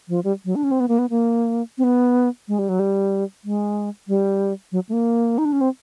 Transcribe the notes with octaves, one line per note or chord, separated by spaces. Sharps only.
F3
G3
F#3
D4
C#4
C4
B3
A#3
B3
A#3
C4
B3
G#3
G3
F#3
G3
G#3
G3
F#3
A3
A#3
D#4
D4
C#4
C4